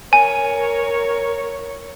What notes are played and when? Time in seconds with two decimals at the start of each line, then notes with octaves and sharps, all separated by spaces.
0.13 A#4 C#5 G#5